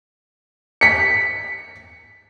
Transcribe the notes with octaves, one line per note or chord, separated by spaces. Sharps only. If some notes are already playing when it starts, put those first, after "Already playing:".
B6 C#7